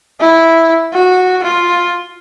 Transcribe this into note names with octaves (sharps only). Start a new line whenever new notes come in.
E4
F#4
F4